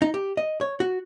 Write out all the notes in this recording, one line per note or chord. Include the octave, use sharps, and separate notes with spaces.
D#4
G4
D#5
C#5
F#4